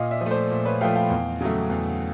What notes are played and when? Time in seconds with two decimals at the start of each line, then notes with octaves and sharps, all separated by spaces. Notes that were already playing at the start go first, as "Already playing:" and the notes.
Already playing: A#2 D#5 F5
0.11 D5 E5
0.21 F3
0.26 A3 C5 D5
0.51 A#2
0.65 B4 C#5
0.81 F3 A3 F5 G5
0.96 F5 G5
1.10 E2
1.41 C#3 F#3 A3
1.70 E2